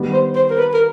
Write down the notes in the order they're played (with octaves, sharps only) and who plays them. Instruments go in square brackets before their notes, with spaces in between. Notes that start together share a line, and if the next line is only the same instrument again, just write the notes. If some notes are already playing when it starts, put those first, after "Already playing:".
Already playing: [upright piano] D#3 G3 B3
[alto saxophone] C5
C5
A#4
B4
A#4